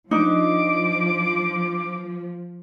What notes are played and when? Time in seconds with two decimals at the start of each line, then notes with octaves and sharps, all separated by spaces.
0.11 F3 D4 D#4 D6